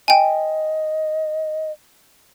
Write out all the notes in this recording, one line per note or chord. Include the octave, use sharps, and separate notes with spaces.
D#5 G5 G#5